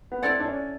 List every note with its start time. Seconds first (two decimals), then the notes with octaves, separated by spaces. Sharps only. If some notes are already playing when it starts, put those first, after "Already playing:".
0.12 B3
0.22 C4 E4 A4 D5 F#5
0.40 D4
0.46 C#4